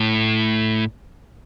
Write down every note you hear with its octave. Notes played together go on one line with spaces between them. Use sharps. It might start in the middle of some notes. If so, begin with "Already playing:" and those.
Already playing: A2